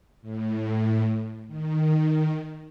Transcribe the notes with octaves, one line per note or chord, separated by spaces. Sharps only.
A2
D#3